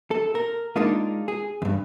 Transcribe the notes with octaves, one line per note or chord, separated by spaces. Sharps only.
A4
A#4
G#3 A#3 D4 D#4 F4
G#4
E2 G2